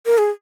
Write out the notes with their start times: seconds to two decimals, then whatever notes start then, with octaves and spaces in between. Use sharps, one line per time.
0.06 A#4
0.18 G#4